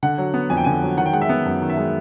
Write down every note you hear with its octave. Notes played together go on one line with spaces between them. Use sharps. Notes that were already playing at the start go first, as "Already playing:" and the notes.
D3 F#5
F#3
B3
F2 G#5
G5
D3 G#5
F#3
D#3 F#5
G5
G#3 F#5
E5
B3
F#2
D#3
E5
G#3